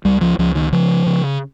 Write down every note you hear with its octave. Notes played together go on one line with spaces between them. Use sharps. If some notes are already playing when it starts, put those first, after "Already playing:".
C#2 G3
F3
C#2 F3
D#3
C#3 F3
C#3